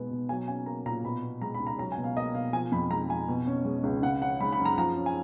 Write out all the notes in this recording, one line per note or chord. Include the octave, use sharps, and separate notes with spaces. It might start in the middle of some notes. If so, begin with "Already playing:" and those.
Already playing: B2 G#3 B3
B2
F#3 G#5
C#4 G#5
A#3 A#5
A#2 A#5
B2 B5
B3
G#3 A#5
B5
C#2
A#5
F#3 A#5
G#5
B2
F5
A#3 D#5
B2 F5
F3 G#5
F2 B5
G#3 A#5
F2 G#5
B2
C#4
G#3
C#2
C#3 F#5
C#4 F#5
G#3 B5
B5
F#2
A#5
F3 A#5
C#4
G#5